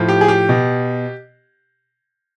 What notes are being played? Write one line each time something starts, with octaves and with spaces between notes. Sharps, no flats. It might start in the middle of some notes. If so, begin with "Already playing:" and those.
Already playing: A2 F3
G4
G#4
G4
B2